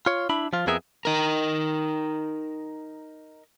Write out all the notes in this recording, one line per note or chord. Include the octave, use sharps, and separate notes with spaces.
F4 C#5
D4 E4 B5
F3 F4
F2 B3 G#4 A#4 E5
D#4 A#4